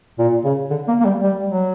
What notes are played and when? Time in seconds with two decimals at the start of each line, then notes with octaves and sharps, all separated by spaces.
0.19 A#2
0.44 C#3
0.70 D3
0.88 A#3
1.00 A#3
1.05 G3
1.23 G3
1.48 F#3